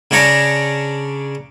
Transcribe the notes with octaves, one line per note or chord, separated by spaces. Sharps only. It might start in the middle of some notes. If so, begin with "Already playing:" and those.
C#3 D4 C#5 A#5